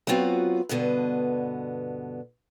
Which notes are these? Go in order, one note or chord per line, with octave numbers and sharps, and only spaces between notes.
F#3 B3 C4 F4 F#4
G2 B2 D3 B3